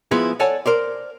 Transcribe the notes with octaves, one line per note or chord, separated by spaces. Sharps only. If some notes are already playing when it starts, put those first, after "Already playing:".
F3 G#3 B3 E4 F4 G#4
A4 C#5 D5 F#5 G#5 A5
A#4 C5 D5